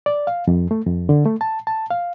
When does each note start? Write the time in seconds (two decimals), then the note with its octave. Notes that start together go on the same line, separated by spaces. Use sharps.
0.06 D5
0.27 F5
0.47 F2
0.71 A3
0.86 F2
1.09 D3
1.25 A3
1.41 A5
1.67 A5
1.91 F5